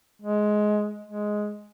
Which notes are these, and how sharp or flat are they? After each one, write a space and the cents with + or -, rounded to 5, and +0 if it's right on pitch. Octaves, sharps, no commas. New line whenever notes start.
G#3 +15
G#3 +5